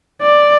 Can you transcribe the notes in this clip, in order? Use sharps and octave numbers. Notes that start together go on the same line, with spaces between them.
D5